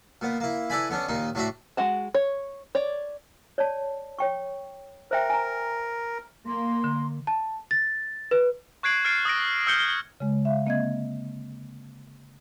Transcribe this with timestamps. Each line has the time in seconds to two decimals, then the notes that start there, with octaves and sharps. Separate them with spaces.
0.21 A#2 B3
0.40 A#3 E4
0.70 E4 A4 B4 D5 G#5 B5
0.90 D3 B3 C#4 D4
1.08 D#2 A#2 D#4
1.35 A2 D4 F#4 E5
1.77 G#3 F#4 F#5 A5
2.15 C#5
2.75 C#5 D5
3.58 C#5 D5 A5
4.19 C#5 G5 C#6
5.11 A#4 C5 E5 G5
5.30 G#5 A#5
6.46 A#3 C6
6.84 D3
7.27 A5
7.71 A6
8.31 B4
8.83 C#6 F#6 G#6 C7 D7 F#7
9.05 F6 A6 C7 D7
9.25 D#6 E6 A#6 D7
9.67 E6 F6 G6 C#7 G7
10.20 C#3 G#3
10.45 E5 F5
10.66 D3 A#3 C4 D#5 E5 G#6